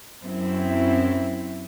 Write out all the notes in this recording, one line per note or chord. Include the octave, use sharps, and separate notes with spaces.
F#2 C4 E4